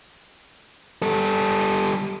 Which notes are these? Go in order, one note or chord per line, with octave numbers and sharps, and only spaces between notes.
G3 A4